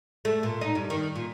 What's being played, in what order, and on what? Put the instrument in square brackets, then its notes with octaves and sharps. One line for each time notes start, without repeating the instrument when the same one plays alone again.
[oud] A3
A#2
D#4
G2
D#3
A#2